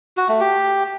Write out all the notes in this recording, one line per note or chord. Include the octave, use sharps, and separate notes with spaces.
F#4
A3
G4